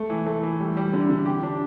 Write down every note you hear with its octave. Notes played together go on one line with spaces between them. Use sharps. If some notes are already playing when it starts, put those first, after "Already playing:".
Already playing: A3
E3
A3
E3
G3
G3
D3
D3
G4
D4